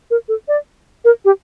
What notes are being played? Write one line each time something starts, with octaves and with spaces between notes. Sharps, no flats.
A#4
A4
D5
A#4
G4